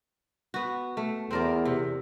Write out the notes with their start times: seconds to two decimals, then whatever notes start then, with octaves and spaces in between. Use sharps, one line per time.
0.54 B3 F#4
0.97 A3
1.31 E2 C4 A#4 D5
1.65 C3